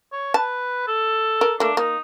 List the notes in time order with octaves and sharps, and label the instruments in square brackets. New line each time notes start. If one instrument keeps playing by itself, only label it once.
[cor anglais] C#5
[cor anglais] B4 [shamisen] A5
[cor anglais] A4
[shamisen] A#4
[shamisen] A3 A#3 [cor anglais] D4
[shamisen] A#3 [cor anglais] D#4